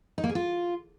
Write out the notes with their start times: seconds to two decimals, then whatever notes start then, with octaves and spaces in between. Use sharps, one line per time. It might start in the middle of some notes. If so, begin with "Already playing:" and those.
0.18 D#4
0.24 A#3
0.29 G#4
0.35 F4